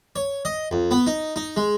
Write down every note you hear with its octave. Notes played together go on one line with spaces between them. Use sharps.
C#5
D#5
F2
B3
D#4
D#4
G#3